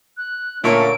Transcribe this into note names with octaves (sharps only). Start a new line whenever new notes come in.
F#6
A#2 D3 A3 A#3 C#4 C#5 D7